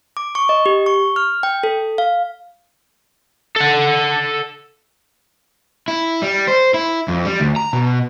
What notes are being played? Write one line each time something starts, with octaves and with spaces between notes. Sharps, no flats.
D6
C#6
D#5
G4
C#6
F6
G5
A4
F5
A4 F#5
E4
G3
C5
E4
F2
G3
D2
A#5
B2